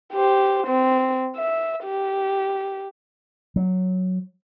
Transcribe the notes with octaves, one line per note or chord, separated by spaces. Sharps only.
G4 C5
C4
E5
G4
F#3